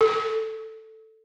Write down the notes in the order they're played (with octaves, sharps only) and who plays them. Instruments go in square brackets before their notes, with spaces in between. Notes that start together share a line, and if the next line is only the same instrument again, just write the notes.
[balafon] A4